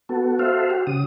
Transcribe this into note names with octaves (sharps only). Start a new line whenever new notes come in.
B3 F#4 A4
F#4 A4 C5 E5 F5
F#4 G4
C#3 D#6